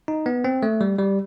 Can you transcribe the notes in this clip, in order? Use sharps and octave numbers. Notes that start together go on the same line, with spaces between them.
D#4
B3
C4
A3
G3
G3